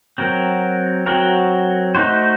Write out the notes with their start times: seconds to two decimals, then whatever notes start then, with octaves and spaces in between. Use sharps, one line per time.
0.18 F#3 C4 F#4 A#4
1.06 F#3 C4 F#4 A#4
1.95 A3 D#4 F#4 C5